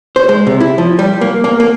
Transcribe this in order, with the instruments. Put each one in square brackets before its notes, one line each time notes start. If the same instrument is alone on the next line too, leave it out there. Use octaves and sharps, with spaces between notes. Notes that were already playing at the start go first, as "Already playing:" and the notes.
[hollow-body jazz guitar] C5
G#3
C3
E4
F3
G3
A#3
A#3
A#3